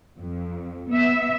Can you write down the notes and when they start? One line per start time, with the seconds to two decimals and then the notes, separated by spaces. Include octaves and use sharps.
0.20 F2
0.90 B3 E5